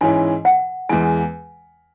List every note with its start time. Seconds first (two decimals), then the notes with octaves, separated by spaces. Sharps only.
0.01 G#2 E3 C#4 E4 G#5
0.45 F#5
0.89 E2 E3 G#3 G#5